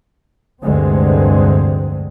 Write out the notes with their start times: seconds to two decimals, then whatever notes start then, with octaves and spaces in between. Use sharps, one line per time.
0.64 F1 D2 G2 D3 G#3 C4